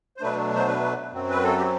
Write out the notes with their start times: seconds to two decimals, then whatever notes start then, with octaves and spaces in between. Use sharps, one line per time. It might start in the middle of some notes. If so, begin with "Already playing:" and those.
0.17 C5
0.21 B2 F#3 A3 D4 B4
0.56 C5
0.67 B4
1.12 F#2 F#3 C4
1.30 B4
1.43 A4
1.58 G4